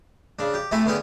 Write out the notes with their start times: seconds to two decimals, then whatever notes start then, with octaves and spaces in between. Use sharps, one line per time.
0.39 C#3 D4
0.54 G4
0.71 C3 A3 E4 A4 E5 G#5
0.85 D3 B3 C#4 G#4 G5